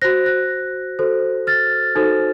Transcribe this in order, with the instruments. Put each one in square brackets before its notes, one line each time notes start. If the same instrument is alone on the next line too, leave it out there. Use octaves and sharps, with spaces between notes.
[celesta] F#4 C5 F#6 A#6
F#6 A#6
F#4 A4 C5
F6 A6
D#4 F#4 A4 C5